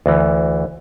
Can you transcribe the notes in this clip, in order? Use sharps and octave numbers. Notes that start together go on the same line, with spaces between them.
D2 E3